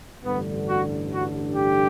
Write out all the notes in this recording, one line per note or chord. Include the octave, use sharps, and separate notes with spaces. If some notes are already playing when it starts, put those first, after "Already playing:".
A1 G2 D3 B3
F#4
F#4
G4